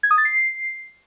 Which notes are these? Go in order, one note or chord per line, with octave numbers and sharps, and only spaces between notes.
G#6
D#6
A6
C7